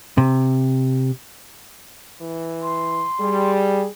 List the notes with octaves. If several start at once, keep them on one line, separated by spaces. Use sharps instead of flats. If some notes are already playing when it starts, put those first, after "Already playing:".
C3
E3
C6
G3 G#4